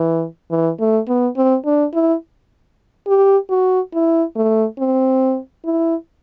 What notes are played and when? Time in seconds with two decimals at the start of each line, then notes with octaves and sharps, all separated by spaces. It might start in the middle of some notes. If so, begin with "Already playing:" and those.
Already playing: E3
0.51 E3
0.80 A3
1.08 B3
1.37 C4
1.66 D4
1.94 E4
3.07 G4
3.50 F#4
3.94 E4
4.36 A3
4.79 C4
5.65 E4